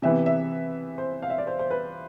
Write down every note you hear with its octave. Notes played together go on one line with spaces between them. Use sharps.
C3 E3 B3 E5
E5
C5
F5
E5
D5
C5
C5
B4